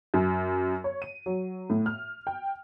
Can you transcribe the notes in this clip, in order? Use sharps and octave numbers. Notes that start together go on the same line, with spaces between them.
F#2
C#5
D#7
F#3
A2
F6
G5